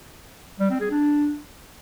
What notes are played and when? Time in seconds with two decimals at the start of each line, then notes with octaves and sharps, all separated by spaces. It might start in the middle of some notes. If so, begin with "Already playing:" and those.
0.60 G3
0.70 C4
0.80 G#4
0.91 D4